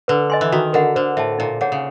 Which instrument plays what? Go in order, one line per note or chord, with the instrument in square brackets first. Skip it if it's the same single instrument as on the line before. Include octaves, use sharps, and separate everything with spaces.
[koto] D3 [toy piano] B4
[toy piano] D#5 G#5 C6
[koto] E3
[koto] D#3 [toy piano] F#4
[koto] D3 [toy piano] A#4 D#5 F#5
[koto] D3 [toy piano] C5
[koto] A2 [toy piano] E5 A5
[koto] A#2 [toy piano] D#4
[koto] A#2 [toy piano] G#4 C#5 F#5
[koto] C#3